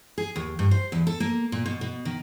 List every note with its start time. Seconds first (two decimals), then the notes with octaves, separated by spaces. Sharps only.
0.18 G#4
0.36 D#2
0.59 G2
0.71 C5
0.92 E2
1.07 A4
1.20 A#3
1.52 A#2
1.66 B2
1.81 B2
2.05 D#3